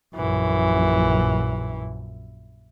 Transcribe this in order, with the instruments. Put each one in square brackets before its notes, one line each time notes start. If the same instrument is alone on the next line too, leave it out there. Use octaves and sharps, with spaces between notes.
[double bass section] A#1 F#2 [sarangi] E3